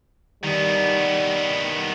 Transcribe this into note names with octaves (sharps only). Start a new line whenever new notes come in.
D#3 G3 B3